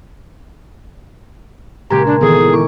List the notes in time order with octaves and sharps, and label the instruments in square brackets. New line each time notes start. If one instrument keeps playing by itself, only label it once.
[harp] A#2 C#3 G#3 [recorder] G4 [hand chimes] A#5 G#6
[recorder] D4
[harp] A#2 D#3 E3 [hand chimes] B3 A4 A#5 [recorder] G#4
[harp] E4 C#6 D6